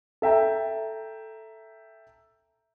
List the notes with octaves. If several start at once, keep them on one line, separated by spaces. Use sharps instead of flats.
A4 E5 G5 A#5